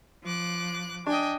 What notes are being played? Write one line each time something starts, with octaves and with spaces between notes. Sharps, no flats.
F3 D6 F#6
D4 D#5 G5 G#5